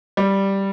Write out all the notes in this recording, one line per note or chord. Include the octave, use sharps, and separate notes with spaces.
G3